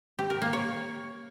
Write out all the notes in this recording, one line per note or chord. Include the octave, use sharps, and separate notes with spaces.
G4
A#4
A#3
C#5